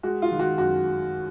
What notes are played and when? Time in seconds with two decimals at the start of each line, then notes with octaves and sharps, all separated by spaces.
0.03 G#3 F#4
0.22 F4
0.32 D#3
0.39 F#4
0.58 F#2 F#4